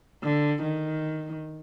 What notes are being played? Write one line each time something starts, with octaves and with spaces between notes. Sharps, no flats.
D3
D#3